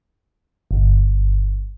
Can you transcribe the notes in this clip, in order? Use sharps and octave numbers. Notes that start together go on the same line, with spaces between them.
G1